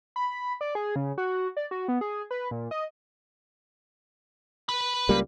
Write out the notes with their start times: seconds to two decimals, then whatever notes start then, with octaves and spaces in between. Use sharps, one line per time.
0.16 B5
0.61 D5
0.75 G#4
0.96 C#3
1.18 F#4
1.57 D5
1.71 F#4
1.88 B3
2.01 G#4
2.31 B4
2.51 A#2
2.71 D#5
4.69 B4 B5
5.09 C#2 G3 A#3